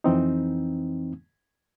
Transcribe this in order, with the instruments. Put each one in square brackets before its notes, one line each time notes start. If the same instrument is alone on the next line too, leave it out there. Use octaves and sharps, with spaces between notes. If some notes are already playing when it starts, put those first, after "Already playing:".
[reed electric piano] F2 E3 C4 D#4